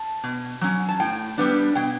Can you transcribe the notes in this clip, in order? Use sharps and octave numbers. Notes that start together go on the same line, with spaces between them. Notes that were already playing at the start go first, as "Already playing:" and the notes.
Already playing: A5
B2
F#3 C#4
A5
A2 G5
G3 B3 D4
B2 G5